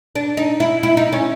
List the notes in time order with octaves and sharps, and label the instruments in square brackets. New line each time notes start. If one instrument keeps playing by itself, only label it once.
[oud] D4
D#4
E4
E4
D#4
C#4